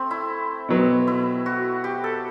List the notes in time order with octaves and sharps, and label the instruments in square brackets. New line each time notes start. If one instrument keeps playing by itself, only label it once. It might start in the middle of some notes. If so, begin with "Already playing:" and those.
Already playing: [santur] A3 C4
E4
[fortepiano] B2 F#3 B3
[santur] E4
F#4
G4
A4